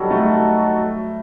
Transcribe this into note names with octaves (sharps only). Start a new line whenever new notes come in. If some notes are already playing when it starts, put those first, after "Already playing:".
Already playing: F#3 G3 D#4 F#4 A4
A3